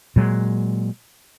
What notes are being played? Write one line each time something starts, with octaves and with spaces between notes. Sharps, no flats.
A#2 F#3 G#3